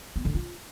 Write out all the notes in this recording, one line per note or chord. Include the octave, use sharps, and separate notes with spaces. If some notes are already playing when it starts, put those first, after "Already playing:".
B3
D3
F4